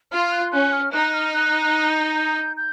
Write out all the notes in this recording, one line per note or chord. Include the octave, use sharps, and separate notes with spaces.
F4 F6
F#6
C#4 F#6
F6
D#4 F#6
F6
F#6
F#6
G6
G6
G6